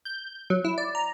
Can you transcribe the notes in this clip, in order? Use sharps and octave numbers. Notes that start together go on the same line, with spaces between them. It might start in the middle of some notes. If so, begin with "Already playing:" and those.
G6
F#3
E4
D5
A#5